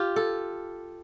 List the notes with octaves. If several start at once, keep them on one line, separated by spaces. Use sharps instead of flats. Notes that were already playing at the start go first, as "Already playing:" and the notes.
Already playing: F4 G4
A4